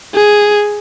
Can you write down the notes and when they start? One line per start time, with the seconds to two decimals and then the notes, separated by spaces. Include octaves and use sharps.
0.15 G#4